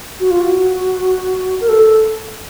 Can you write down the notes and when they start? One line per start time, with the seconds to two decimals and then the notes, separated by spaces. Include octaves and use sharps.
0.20 F#4
0.31 F4
0.41 F#4
1.61 A#4
1.69 A4